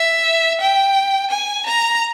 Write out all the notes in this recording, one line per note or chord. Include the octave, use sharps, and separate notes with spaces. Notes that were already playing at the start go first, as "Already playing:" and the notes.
Already playing: E5
G5
G#5
A#5